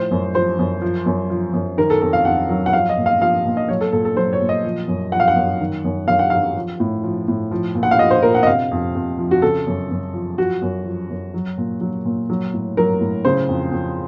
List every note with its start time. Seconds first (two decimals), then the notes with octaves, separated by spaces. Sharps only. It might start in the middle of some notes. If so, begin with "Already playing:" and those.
Already playing: A2 F3 C5
0.11 F#2
0.34 F3 C5
0.59 F#2
0.82 F3
1.06 F#2
1.30 F3
1.53 F#2
1.77 D#3 A#4
1.90 A4
2.02 F2 A4
2.13 F5
2.25 F2 F#5
2.49 F#3
2.66 F#5
2.73 F3 F5
2.89 D#5
2.97 A#2
3.06 F5
3.21 F3 F5
3.45 A#2
3.57 D#5
3.69 F#3 C#5
3.81 A4
3.93 A#2 A4
4.05 A4
4.17 F#3 C5
4.33 C#5
4.40 A#2
4.49 D#5
4.64 F3
4.88 F#2
5.12 F3 F#5
5.20 F5
5.28 F#5
5.36 F#2
5.60 D#3
5.84 F#2
6.08 F#2 F5
6.19 F#5
6.30 F#3 F5
6.56 F3
6.80 A2
7.03 F3
7.28 A2
7.51 F3
7.75 A#2
7.83 F#5
7.91 F5
7.99 F3 D#5
8.11 C5
8.23 A#2 A#4
8.35 F#5
8.43 D#5
8.47 C3 F5
8.71 F2
8.95 F2
9.19 F3
9.31 F#4
9.42 C#3 A4
9.67 F#2
9.91 F#2
10.14 F3
10.38 F3 F#4
10.62 F#2
10.86 F3
11.10 F#2
11.34 F#3
11.58 A#2
11.81 F#3
12.05 A#2
12.30 F#3
12.54 A2
12.77 F#3 A#4
13.01 A2
13.25 C#3 C5
13.49 F2
13.72 F2